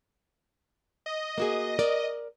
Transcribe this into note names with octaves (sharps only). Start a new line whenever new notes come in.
D#5
A#3 F#4 G#4
A#4 D5